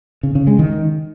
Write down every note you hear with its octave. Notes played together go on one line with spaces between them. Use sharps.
C#3
C#3
G#3
D#3